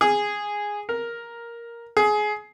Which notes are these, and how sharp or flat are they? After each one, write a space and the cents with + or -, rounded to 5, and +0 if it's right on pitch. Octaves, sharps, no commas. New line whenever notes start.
G#4 -5
A#4 +5
G#4 +20